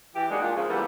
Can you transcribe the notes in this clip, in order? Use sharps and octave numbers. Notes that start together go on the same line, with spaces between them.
E3 G4
G3 G#3 A#3 D4 D#4 F#4
A#2 D4 F4
G#2 C#3 F3
E3 G3 A#3 B3 A4